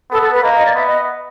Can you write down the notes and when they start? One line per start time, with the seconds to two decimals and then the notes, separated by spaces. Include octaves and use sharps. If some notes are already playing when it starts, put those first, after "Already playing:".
0.11 B3 A4
0.21 A4
0.32 B4
0.42 A#3 D#5
0.54 D#5
0.64 D5
0.75 B3 E5
0.86 D#5